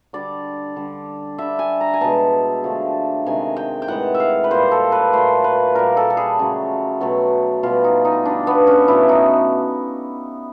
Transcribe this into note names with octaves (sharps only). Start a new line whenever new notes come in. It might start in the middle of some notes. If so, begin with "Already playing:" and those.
D3 G3 D5
D3 G3
D3 G3 E5
G#5
A#5
G#5
B2 G#3 A5
D3 F3 A3
C3 D#3 G#3 G#5
G5
G5
A2 E3 G#3 F#5
E5
F5
B4
A#2 G3 C5
A4
B4
A#2 F#3 A3 C5
B4
A#2 G3 A#4
A4
A4
G#4
C#3 F#3 A3
B2 F#3 A3
B2 G3 F4
D#4
D#4
D3 G3 D4
B3
C#4
B2 F#3 A3 E4
D#4